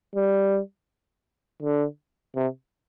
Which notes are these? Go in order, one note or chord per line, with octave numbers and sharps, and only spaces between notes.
G3
D3
C3